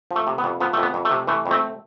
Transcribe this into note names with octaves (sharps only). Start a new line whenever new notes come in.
F3
A3
C3
B3
F2
F3 B3
F2 A3
B3
F2
A3
C3
E3 A3
F2
A3 C4